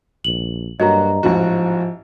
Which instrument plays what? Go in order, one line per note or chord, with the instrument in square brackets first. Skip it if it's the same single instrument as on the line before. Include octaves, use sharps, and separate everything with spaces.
[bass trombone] A#1 [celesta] F#7
[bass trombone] G2 [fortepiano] F#3 A#3 F#4 [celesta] D#5 A#5
[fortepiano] A1 G#2 F#4 [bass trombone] F3